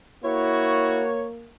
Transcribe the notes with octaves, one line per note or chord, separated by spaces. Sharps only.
A#3 E4 F#4 C#5